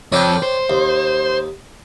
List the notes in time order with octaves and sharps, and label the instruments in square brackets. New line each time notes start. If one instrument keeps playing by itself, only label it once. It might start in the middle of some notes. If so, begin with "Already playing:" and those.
[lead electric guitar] F2 [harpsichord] C#5 D5 G5
[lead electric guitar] C5
[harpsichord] D#2